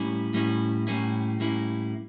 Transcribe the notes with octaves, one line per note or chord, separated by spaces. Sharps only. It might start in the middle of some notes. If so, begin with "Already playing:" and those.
Already playing: A2 G3 A#3 C#4 E4
A2 G3 A#3 C#4 E4
A2 G3 A#3 C#4 E4
A2 G3 A#3 C#4 E4